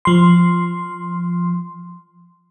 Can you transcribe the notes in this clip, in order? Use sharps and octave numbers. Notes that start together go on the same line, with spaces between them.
F3 C6